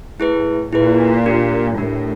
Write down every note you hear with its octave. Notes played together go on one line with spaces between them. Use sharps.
A2 E4 G#4 B4
A#2 E4 G#4 B4
D4 G4 A#4
A2 D4 G4 A#4